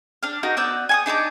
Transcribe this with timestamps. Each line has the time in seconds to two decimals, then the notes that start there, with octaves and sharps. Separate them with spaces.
0.23 D4 F6
0.43 D#4 F#4 A#4
0.57 B3 D5 E6 G6
0.89 G#5 C#6 D#6
1.06 D4 D#4 A5 D6